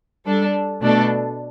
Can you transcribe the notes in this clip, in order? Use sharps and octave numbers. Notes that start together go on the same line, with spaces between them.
G3 D4 A4
B2 A3 D4 A4